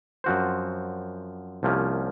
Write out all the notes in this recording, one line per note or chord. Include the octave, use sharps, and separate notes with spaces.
F#2 F3 C4 F#4 C5
C2 C3 F3 A#3 C#4